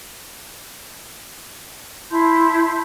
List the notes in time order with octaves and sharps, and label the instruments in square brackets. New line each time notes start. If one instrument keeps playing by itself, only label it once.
[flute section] E4 A5 C6 G6